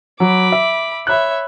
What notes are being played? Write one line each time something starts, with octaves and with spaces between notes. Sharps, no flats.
F#3 B5 D6
E5
C#5 E5 B5 F#6